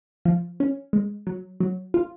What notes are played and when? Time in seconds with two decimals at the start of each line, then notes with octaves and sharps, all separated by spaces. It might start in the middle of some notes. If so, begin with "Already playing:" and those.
0.25 F3
0.60 C#4
0.93 G#3
1.27 F#3
1.60 F#3
1.94 F4